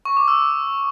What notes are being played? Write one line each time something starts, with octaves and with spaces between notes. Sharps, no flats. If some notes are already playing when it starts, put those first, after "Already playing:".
C#6
D6
E6